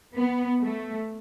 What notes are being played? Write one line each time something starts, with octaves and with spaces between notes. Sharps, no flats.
B3
A3